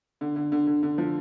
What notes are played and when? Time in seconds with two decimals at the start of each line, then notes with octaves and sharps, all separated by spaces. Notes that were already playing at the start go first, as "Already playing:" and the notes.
0.21 D3
0.36 D3
0.52 D3
0.67 D3
0.83 D3
0.98 F3